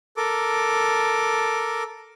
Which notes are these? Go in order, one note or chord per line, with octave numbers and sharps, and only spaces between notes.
A4 A#4 D6